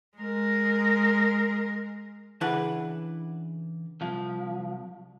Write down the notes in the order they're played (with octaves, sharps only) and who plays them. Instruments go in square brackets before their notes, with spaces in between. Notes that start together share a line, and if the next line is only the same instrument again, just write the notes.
[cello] G#3 A#4
[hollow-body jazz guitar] C#3 E3 D4 E4 B4 F#5
[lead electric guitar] C2 F3